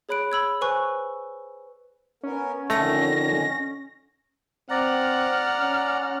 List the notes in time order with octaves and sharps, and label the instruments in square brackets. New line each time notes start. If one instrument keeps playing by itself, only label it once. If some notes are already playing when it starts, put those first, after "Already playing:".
[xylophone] G#4 C#5 B5 F#6 D7
B5 E6 G#6
B4 C5 G#5 C#6 E6 F#6
[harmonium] B3 A#4 [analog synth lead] C#4
[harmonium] F2 D3 D#3 [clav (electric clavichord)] A3 [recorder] A#6
[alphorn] C4 [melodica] D5 A#5 [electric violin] F#5 F6
[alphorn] C#4